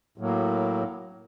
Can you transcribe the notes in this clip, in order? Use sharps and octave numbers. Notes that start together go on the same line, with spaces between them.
A2 F#3 A#3